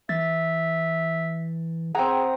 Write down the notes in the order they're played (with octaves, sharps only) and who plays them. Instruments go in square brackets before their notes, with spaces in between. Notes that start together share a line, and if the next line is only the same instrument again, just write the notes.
[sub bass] E3 [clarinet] E5 [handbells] A6
[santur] C4 A#5 [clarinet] G#4 [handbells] F#5 G5